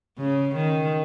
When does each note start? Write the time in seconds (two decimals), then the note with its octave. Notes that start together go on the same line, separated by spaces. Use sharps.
0.18 C#3
0.55 D#3